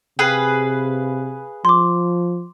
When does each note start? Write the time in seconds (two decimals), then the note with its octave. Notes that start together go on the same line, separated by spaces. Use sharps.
0.19 C3 G#4 B4 F5
1.65 F3 C6 D6